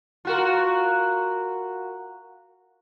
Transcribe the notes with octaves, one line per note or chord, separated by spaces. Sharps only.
F4 F#4 A#4